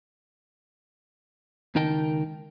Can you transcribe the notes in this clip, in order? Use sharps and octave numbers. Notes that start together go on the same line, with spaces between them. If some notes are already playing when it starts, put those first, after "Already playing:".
C#2 D#3 D#4 A#4 G5 A5